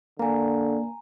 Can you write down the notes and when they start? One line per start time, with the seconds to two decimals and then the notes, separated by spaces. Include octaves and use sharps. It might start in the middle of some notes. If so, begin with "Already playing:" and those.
0.19 D3 A#3 G#5 A#5